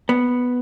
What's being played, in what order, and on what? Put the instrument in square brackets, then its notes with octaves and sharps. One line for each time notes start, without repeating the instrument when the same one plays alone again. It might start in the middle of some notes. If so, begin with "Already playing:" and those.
[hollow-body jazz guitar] B3